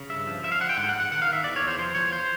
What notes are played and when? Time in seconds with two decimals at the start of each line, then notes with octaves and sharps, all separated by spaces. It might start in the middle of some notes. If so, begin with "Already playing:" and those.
Already playing: C#3
0.09 G2 E5
0.27 F3
0.43 F3 E5
0.52 F5
0.60 D3 F#5
0.69 G5
0.77 G#2 F#5
0.89 F#5
0.94 G#2
1.00 F#5
1.11 D#3 F#5
1.22 F5
1.28 D#3 E5
1.44 E2 D5
1.56 C#5
1.62 E2
1.67 C5
1.78 F3 C5
1.95 E2 C#5
2.12 C5